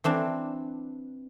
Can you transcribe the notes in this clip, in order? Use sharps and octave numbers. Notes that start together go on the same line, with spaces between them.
E3 C4 D4